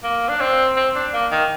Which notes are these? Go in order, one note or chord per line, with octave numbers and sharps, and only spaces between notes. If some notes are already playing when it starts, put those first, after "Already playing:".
A#3
D4
C4
C4
D4
A#3
D#3